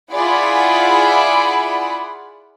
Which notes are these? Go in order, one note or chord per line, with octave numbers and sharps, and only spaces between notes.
E4 F4 G#4 D5 F#5 B5